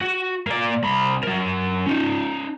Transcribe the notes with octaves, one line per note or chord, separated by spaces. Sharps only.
F#4
A#3 D5
C2 B5
F#3 A#4
C#4 D#4